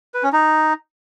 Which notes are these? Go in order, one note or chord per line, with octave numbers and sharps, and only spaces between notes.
B4
C#4
D#4